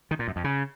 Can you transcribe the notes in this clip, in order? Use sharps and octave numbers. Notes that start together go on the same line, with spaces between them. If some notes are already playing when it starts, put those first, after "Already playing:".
D#3
A#2
F#2
F2
C#3